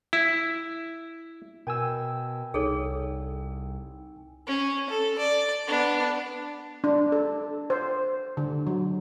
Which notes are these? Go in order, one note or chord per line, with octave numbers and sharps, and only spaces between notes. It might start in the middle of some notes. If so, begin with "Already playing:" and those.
E4
B2 A#4 G5 G#5 E6
C2 D#4 G#4 A4 C#5
C#4
A4
D5
B3 D4
D4
A4
C5
D3
F#3